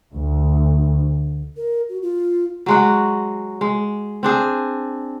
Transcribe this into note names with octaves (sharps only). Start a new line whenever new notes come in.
D2
A#4
F#4
F4
F#3 G#3 F#4
G#3
C4 D4 G#4